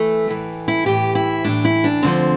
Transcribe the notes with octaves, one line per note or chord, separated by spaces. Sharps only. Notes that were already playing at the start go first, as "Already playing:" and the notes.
Already playing: E3 A3
A2 E3
E4
A2 E3 G4
E4
A2 E3 D4
E4
D4
D2 D3 F3 C4